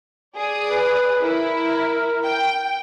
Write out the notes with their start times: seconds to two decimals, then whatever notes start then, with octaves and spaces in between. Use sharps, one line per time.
0.36 G#4 D5 D#6
0.69 B4
1.22 E4 A#4
2.24 G5